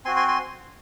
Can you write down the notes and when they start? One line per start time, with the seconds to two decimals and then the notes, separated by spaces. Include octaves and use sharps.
0.05 C4 F#4 G#5 C6
0.16 G#5 C6
0.28 G#5 C6